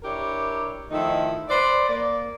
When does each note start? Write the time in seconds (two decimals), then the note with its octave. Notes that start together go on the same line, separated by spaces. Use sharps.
0.03 D4 E4 G4 A#4 C#5
0.91 D#3 F3 A3 D#4 E4
1.49 B4 C5 D5
1.89 A#3 D5